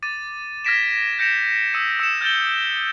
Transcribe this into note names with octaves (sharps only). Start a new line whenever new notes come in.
D6 A6 D#7
F6 G#6 A#6 B6 D7 E7
G6 A#6 C#7 D7 E7 F7
D#6 E6 B6 C#7 D#7
E6 C#7 E7
F6 G6 A6 D7 E7 G7